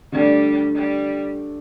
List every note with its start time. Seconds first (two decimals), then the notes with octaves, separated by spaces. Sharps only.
0.12 D3 G3 A3 D4
0.75 G3